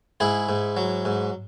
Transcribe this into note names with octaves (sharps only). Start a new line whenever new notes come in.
G#2 E4 G#4
G#2
F#3
G#2